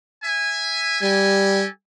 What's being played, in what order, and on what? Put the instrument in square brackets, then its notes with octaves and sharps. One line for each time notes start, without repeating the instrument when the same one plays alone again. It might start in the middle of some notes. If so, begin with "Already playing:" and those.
[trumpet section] E5 G#5
[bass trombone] G3 [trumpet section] G4 A4 G#5